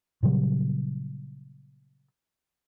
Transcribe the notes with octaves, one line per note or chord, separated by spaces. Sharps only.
A#2 C#3 F#3 G3